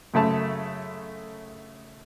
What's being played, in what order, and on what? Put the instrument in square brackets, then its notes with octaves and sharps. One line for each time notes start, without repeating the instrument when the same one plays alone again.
[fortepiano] F#2 C#3 A3 A5